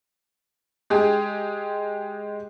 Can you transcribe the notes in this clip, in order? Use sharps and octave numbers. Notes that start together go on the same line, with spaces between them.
G#3 G4 G#4